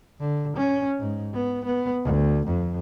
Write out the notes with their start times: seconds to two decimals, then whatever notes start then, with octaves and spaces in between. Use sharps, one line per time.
0.20 D3
0.57 C#4
1.00 G#2
1.34 B3
1.65 B3
2.04 D2
2.47 F2